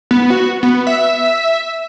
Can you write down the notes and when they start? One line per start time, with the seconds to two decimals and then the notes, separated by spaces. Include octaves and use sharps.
0.11 B3
0.30 F#4
0.63 B3
0.87 E5